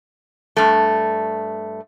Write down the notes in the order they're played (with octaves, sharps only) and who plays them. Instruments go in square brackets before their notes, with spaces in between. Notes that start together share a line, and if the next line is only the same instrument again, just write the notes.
[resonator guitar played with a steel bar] G2 A3